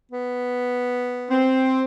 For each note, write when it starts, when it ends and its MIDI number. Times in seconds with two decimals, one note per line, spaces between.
0.12 1.49 59
1.29 1.83 60